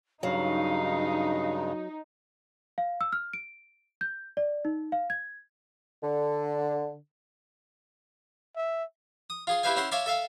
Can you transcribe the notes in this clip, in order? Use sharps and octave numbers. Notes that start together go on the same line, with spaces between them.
G2 C#3 F#3 D#4 F5
F5
E6
F6
D7
G6
D5
D#4
F5
G#6
D3
E5
D#6
F4 G#4 C6
E4 G4 B4 C5 F5 G#5
C#4 E4 C5 F#5 C6
C#5 E5 F5 A5 C6 D6
A4 E5 F5 A5